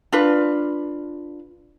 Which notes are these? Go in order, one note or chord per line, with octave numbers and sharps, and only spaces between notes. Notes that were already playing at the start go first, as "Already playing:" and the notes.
D4 F4 B4